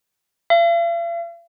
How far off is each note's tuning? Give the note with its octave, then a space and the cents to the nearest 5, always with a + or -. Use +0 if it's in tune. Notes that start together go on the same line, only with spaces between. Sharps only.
F5 -45